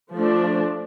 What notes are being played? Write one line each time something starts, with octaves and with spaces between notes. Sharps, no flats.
F3 A3 D4